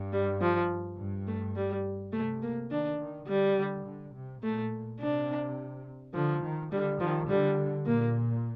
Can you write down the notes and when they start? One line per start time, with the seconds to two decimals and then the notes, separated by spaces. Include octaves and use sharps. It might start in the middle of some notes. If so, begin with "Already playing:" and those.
Already playing: G2
0.13 G3
0.41 F3
0.99 G2
1.27 A3
1.56 G3
2.13 C3 A3
2.42 A#3
2.70 D#3 D4
2.99 D#3
3.27 D3 G3
3.56 D3
3.85 D3
4.14 C3
4.42 A#2 A3
5.00 C3 D4
6.14 D3 F3
6.42 D#3
6.72 D3 G3
7.00 D#3 F3
7.29 D3 G3
7.86 A#2 A#3